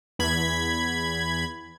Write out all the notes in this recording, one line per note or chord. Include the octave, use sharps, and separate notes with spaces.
E2 B5 G#6